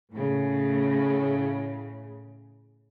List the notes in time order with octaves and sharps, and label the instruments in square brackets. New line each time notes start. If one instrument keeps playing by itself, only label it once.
[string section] A2 C#3